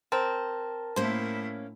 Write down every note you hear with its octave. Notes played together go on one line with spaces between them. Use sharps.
C4 A#4 A5
A2 A#3 C#4 E4 C5